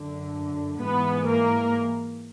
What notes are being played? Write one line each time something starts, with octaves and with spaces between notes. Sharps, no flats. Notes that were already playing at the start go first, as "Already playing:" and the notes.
Already playing: F#2 D3
G#2 E3 B3 B4
A#3 A#4